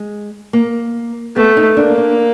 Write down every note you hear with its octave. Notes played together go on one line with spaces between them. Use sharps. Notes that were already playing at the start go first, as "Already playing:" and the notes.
Already playing: G#3
A#3
A3 B3
D#4
A#3 D4
D4